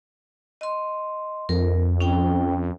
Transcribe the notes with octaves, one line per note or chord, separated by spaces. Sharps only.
D#5 C6
F2 A#4
C#4 G5